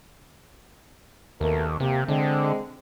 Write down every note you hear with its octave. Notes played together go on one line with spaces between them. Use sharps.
D#2 B2 A3 A#4
C3 A#3 G4
D3 G#3 C4